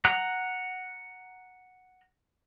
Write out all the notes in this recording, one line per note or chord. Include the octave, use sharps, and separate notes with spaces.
F#5 A#5 F#6